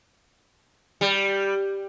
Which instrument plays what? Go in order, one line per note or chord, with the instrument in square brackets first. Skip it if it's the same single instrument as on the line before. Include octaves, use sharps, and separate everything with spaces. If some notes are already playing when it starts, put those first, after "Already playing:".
[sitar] G3